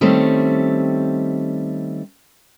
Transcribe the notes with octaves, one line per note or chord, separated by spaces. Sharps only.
D#3 G3 A3 C4 C#4